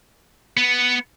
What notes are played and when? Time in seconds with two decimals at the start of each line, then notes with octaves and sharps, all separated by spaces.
0.57 B3